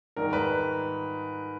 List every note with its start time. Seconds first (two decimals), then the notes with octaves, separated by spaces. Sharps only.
0.16 G#2 D#3 G3 A#4
0.33 B4